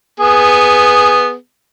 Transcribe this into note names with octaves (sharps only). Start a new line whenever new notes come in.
B3 G#4